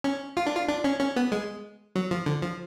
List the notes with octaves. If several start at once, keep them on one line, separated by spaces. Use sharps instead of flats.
C#4
F4
D4
F4
D4
C#4
C#4
B3
G#3
F#3
F3
D3
F3